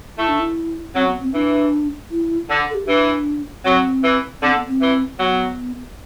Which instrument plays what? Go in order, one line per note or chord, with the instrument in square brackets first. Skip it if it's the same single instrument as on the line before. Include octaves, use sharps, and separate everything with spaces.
[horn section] A3 [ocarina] E4
[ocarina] D4
E4
[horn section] F#3 [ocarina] C4
[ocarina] B3
C4
[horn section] E3 [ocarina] D4
[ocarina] E4
[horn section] D3
[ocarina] A4
G4
[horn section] E3 [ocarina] D4
[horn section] F#3 [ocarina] C4
[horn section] E3
[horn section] D3 [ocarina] C4
[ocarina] B3
C4
[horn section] E3
[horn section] F#3 [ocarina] B3